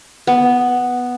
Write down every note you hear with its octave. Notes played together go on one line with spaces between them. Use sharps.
B3